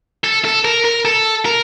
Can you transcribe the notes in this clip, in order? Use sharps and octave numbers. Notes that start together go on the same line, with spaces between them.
A4
A4
A#4
A#4
A4
A#4